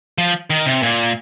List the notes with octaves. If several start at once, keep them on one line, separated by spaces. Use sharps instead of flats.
F3
D#3
C3
A#2